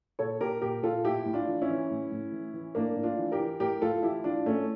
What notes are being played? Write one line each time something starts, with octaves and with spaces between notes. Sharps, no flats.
A#2 A4 C#5
A#2 G4 A#4
A#2 G4 A#4
A#2 F4 A4
A2 E4 G4
A2
D4 F4
E3
C#4 E4
E3
A2
A2
E3
E3
A2 A#3 D4
A2
D4 F4
E3
G4 A#4
E3
A2 G4 A#4
A2 F4 A4
E3 E4 G4
E3 D4 F4
A2 A3 C#4